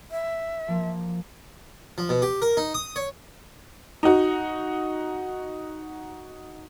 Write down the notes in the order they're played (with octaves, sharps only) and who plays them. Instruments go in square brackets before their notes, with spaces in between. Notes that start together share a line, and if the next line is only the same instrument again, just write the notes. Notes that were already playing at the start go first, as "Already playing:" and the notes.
[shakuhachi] E5
[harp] F3 A#3
[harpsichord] F3
B2
G4
A#4
D#4
D#6
C#5
[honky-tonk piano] D#4 F#4